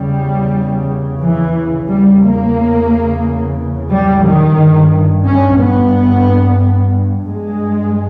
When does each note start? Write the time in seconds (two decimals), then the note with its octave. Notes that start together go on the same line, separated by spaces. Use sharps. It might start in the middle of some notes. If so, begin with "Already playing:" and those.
Already playing: E2 C#3 G3
1.22 E3
1.89 E2 C#3 G3
2.23 A#3
3.91 G3
4.24 D#3
4.58 G2
5.25 C#4
5.58 B3
7.27 G2 G#3